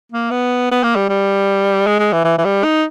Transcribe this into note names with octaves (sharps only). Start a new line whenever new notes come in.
A#3
B3
B3
A#3
G3
G3
G#3
G#3
E3
E3
E3
G3
D#4